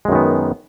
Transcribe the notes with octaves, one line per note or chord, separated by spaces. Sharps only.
F#2 D#3 G#3 B3